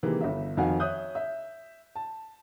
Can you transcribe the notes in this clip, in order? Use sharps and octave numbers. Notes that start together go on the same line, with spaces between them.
C3 D#3 E3 G#3 A#3
G1 E5
F2 D#3 C4 F#4 F5 G#5
C#5 E5 D#6 F#6 G6
E5
A5